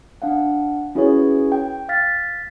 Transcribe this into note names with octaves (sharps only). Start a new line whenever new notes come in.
D4 F5 F#5
C#4 E4 F#4 G#4 B4 C#5
G5
F5 F6 A6 B6